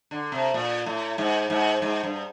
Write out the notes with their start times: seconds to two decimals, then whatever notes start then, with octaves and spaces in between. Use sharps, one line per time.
0.11 D3
0.32 C3
0.54 A#2
0.86 A2
1.18 G#2
1.50 G#2
1.82 G#2
2.04 G2